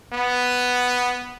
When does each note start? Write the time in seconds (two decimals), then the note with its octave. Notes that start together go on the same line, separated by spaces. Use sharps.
0.13 B3